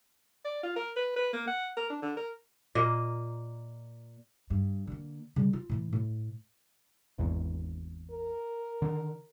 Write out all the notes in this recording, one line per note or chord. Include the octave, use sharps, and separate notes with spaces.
D5
F4
A#4
B4
B4
A#3
F#5
A#4
D4
D3
A#4
A#2 A#3 D#5
G2
D3 A#3
C#3 G3
F4
A2 E3
A2
G#1 E2 G#2
A#4
D3 D#3